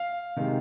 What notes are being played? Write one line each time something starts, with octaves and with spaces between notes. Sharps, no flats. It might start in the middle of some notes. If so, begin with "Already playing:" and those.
Already playing: F5
C3 D#3 G#3